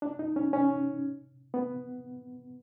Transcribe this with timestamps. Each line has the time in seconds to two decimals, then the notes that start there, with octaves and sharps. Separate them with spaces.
0.02 D4
0.19 D#4
0.36 C#4
0.53 C#4
1.54 B3